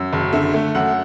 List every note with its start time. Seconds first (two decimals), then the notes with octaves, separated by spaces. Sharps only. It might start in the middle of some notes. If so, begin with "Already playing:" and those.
Already playing: F#2
0.13 F#1
0.33 D3 E5
0.54 A3
0.75 F#2 F#5